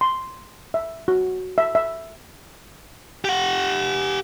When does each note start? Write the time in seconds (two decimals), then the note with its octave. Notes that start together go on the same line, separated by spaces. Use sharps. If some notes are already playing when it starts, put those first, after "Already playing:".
0.01 C6
0.74 E5
1.08 F#4
1.58 E5
1.75 E5
3.25 G4 F#5